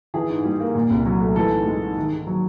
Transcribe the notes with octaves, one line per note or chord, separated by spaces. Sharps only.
E3 G#4
G#2
G3
A#3
A#2
C2
F#3
A3
E3 A4
G#2
G#3
G#2
D#3
G#2
F#3